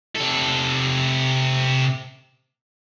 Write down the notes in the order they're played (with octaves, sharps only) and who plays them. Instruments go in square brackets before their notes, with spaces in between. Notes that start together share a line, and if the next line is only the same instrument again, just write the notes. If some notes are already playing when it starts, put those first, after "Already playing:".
[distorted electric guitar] C3 A4